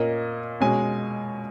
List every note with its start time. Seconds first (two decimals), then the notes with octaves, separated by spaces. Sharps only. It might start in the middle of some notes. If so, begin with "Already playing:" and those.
Already playing: A#2 A#3 C#4 D#5
0.60 B2 G#3 C#4 G#5